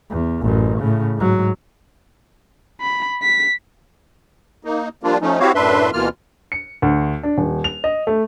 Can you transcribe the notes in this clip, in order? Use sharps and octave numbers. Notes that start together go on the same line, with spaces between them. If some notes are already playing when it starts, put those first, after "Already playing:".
E2
A1 F#2
A2 C#3
G#2 F#3
B5
B6
A#3 D#4
F3 G3 A#3 D4 F4
F3 A3 C#4 D#4
C4 E4 F#4 G4 C#5 F5
F#2 A2 D4 B4 E5 C6
D2 B2 E3 A#3 F4 F6
C#7
D2
D4
D#1
F7
D#5
A3